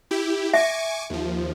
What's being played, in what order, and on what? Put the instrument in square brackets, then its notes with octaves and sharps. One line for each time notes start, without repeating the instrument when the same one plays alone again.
[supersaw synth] E4 G4
[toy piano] E5 [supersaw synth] G#5 C#6 D6
[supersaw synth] D#2 F3